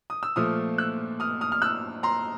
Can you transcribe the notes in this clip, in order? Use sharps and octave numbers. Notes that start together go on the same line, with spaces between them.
D#6
E6
A#2 F3 A3 D#6 F6
E6 F#6
D#6 F6
D#6 F6
F6
E6 F#6
A#5 C6